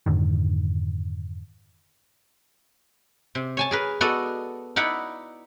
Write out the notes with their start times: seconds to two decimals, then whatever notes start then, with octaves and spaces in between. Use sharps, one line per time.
0.06 F2 G#2 D3 D#3
3.35 C3
3.57 C#5 G#5 A5
3.71 G#4 A#4 B4
4.01 B3 F#4 A4 D5 D#5
4.76 D#4 E4 D5 F#5 B5